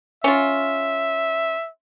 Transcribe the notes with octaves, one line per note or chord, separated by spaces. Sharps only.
C#4 F4 E5